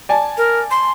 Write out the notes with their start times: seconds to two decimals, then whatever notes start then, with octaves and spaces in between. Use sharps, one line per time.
0.09 D5 G#5 A5
0.38 A#4
0.71 C6